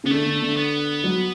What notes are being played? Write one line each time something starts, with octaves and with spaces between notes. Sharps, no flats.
C#3 B3
D3 A3
D3
D3
B3
F#3